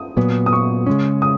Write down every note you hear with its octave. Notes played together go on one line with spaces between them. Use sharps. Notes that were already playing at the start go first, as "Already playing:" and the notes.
Already playing: D#6
A#2 F#3 B3
D#6
C#6
C#3 G#3 C#4
D#6